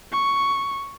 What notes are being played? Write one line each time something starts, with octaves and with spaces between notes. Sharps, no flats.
C#6